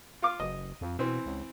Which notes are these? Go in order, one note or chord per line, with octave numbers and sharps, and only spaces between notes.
F4 F5 D6
F#1 D#5
F2
B2 E3 C4
C#2